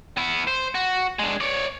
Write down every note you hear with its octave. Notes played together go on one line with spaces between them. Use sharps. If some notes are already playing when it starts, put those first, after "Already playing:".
B3 E4
C5
F#4
G#3 D4
C#5 D5